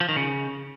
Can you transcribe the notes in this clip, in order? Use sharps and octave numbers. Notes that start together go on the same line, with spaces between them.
F3
D#3
C#3